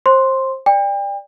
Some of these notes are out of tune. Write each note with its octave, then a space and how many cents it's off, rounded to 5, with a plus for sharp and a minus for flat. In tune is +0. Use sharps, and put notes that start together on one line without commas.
C5 +25 C6 +0
D5 +0 G5 +35